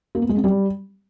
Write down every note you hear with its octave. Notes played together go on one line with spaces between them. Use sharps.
A#3
B3
G#3
C4
G3